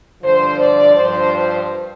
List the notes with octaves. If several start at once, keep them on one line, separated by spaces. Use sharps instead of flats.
G2 D3 F3 C5
D5
G2 F3 C5